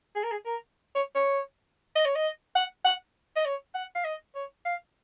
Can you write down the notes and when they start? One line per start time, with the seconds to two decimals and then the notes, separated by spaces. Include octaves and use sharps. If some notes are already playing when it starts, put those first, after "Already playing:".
0.15 G#4
0.23 A#4
0.31 G#4
0.46 A#4
0.95 C#5
1.15 C#5
1.96 D#5
2.05 C#5
2.15 D#5
2.55 F#5
2.85 F#5
3.36 D#5
3.45 C#5
3.75 F#5
3.95 F5
4.05 D#5
4.35 C#5
4.65 F5